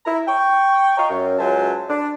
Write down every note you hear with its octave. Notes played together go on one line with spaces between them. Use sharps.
E4 A#5
G5 C#6
D#5 F5 A#5 C#6
F#2
C#2 F#3 C5 E5 G#5 A5
D4